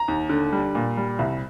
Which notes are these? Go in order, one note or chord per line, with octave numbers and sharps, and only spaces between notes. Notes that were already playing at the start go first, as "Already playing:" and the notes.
Already playing: A#5
D#2
D3
G3
A#2
G3
C2